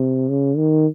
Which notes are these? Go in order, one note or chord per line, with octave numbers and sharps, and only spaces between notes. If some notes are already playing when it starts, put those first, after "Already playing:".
Already playing: C3
C#3
D#3